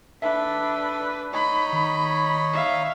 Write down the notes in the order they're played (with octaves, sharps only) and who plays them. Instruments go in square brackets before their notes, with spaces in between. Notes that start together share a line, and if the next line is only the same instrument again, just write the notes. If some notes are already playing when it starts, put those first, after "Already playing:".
[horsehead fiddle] D4 B4 [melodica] A4 [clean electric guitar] E5
[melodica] D#4 C#5 [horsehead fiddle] B5
[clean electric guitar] D#3
[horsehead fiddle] E5 F5